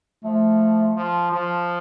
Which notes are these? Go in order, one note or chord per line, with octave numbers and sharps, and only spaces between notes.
F3 A3
F3
F3